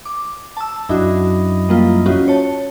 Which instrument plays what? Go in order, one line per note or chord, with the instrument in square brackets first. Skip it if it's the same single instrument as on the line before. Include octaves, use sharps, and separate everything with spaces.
[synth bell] D6
A5 E6
[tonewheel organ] F#2 E4 D#5 [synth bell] D4 F#4
[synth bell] G3 A#3 F4
C#4 F4 F#4
C#5 A5